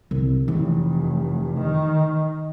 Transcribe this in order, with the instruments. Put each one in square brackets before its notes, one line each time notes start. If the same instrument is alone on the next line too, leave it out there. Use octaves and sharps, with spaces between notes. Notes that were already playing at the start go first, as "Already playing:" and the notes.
[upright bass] C2
[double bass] F1 [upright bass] E3
[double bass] D#3